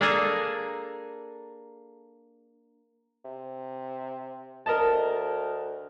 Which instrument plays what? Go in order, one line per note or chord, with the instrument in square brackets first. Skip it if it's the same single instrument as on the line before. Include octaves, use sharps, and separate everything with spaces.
[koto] A#3 D4 G#4 A4 G#5 A#5
[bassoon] C3
[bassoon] D2 [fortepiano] A#4 D#5 A5